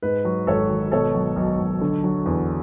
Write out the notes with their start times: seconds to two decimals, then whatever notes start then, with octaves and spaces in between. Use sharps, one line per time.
0.03 G#2 B4
0.25 F#3
0.47 G#1 A4 C#5
0.70 G#1
0.92 B2 A4 C#5
1.14 F#3
1.36 B1
1.60 B1
1.81 D3
2.04 F#3
2.26 E2